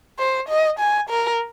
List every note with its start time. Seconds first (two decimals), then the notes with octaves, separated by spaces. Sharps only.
0.19 C5
0.49 D#5
0.79 G#5
1.09 A#4